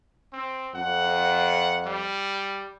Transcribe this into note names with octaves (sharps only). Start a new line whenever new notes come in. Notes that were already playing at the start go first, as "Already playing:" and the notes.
C4
F2 F#5
G3